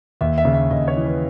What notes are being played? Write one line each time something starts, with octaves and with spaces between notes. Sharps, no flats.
D#2 E5
E5
C#3
E5
D#2 D#5
C#5
E3
B4